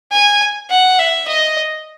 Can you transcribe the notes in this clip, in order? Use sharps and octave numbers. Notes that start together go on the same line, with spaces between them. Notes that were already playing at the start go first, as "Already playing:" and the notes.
G#5
F#5
E5
D#5